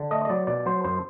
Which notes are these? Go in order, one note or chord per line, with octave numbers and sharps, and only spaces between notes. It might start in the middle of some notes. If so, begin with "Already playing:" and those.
Already playing: D3
A3 D#5
D#5
F#3 D5
B2 D5
F#3 C5
F#2 C5